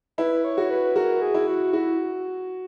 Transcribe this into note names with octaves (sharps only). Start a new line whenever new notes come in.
E4 B4
C#5
F#4
B4
F#4 A#4
G#4
E4
F#4
E4 F#4